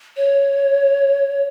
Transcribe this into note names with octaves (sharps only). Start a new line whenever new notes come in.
C#5